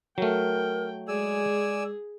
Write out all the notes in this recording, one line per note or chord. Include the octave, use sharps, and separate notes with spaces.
F#3 A3 A#4 G5
G#3 G#4 D5 G#5 E6